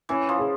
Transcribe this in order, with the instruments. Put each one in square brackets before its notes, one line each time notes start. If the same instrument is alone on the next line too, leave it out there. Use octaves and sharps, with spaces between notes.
[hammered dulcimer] E3 [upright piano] C#4
[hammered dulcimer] F3
[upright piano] G#4